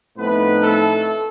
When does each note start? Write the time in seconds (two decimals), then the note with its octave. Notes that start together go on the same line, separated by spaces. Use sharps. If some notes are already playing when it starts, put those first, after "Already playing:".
0.17 A2 F3 A3 B3 C4 D#4 B4
0.62 A3 A4